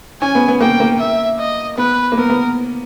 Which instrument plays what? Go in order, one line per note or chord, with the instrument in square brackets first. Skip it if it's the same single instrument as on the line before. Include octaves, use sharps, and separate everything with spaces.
[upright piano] C#4 [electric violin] G#5
[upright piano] B3
B3
[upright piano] A#3 [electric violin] G5
[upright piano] A#3
[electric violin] E5
D#5
[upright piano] B3 [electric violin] B4
[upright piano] A#3
[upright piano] B3 [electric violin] A#4
[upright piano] B3